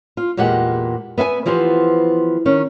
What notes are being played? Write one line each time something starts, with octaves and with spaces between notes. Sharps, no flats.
F4
E2 A#2 G#3 G4 F#5
B3 E5 F5 G#5
E3 F3 B3 G4 C5
D#3 C#4